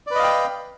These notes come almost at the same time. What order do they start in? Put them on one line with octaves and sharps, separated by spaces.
D5 B4 D#5 F5 G5